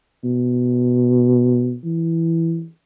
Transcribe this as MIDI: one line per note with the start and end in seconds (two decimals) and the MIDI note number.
0.24 1.77 47
1.85 2.67 52